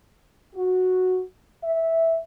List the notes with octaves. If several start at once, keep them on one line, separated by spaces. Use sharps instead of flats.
F#4
E5